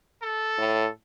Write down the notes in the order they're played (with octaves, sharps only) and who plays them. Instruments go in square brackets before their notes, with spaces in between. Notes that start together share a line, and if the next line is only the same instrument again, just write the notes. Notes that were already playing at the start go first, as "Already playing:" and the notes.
[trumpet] A4
[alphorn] A2